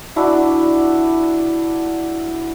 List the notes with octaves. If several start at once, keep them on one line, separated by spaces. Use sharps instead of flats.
D4 E4 F#4